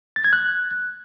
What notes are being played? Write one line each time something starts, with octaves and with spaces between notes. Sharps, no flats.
A6
G#6
F#6